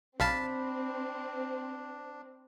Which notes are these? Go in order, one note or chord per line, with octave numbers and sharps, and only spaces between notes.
B1 C4 D4 F5 A5 B5